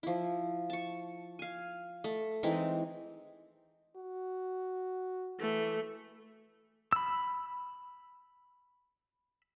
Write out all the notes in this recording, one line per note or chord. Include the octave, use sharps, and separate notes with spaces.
F3 E4
A5 C#6
F5 G#5
A3
E3 G#3 C4 D#4
F#4
E3 A3
B5 E6